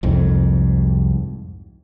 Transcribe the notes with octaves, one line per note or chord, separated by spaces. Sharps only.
C2 F2 G#2